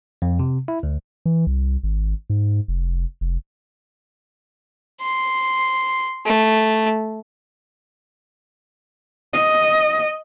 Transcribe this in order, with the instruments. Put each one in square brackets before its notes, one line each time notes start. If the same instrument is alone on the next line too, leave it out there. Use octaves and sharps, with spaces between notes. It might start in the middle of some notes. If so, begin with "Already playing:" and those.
[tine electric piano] F2
C3
E4
D2
[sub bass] E3
C2
G#1
G#2
F1
F1
[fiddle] C6
A3
[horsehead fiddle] D#5